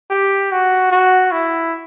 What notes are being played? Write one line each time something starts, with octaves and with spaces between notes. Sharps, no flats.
G4
F#4
F#4
E4